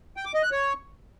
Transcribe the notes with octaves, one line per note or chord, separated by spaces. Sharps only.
G5
D6
D#5
F#6
C#5